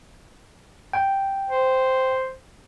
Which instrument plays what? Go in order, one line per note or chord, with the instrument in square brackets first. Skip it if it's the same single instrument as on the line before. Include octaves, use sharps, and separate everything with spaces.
[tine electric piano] G5
[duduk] C5